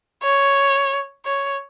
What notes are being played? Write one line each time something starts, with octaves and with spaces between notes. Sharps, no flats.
C#5
C#5